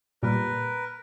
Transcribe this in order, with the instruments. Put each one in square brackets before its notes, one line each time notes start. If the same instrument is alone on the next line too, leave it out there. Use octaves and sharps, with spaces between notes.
[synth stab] A#2 G3 [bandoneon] A#4 B4